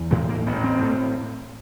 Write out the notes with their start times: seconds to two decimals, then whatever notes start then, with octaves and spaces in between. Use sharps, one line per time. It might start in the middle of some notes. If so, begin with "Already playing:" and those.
Already playing: E2
0.11 A2 G#3
0.29 A#3
0.47 A1 B3
0.64 C4
0.82 A2